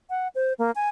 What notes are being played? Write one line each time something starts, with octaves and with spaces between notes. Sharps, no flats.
F#5
C5
A#3
G#5